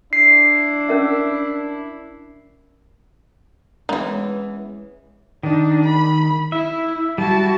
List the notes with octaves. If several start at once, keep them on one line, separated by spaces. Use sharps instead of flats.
D4 E4 C7
C#4 A#4 E5
D#3 E3 G#3 B3 C#4
D#3 D4 D#4
B5
E4 E5
G3 E4 F#4 A5